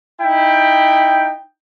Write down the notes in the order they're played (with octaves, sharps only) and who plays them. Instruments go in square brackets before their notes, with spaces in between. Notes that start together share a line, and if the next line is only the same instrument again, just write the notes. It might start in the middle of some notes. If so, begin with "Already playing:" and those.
[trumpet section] D#4 E4 G5